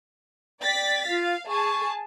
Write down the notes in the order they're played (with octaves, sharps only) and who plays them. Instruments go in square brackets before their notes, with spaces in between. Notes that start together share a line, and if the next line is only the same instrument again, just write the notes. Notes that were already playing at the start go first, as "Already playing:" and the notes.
[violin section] D5 A6 B6 [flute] G5
[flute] F4 [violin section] F5
[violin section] G#4 G#5 A5 [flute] C#6